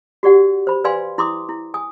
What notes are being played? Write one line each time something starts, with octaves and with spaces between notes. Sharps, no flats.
F#4 G4 D5 F#5
C5 B5
B4 D5 F5 G#5 C6
E4 C6 D6 D#6
E4
G#5 D#6